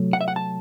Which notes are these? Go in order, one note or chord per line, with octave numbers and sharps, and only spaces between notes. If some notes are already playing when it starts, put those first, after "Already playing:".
Already playing: C3 F#3 A3
F#5
E5
F#5
A5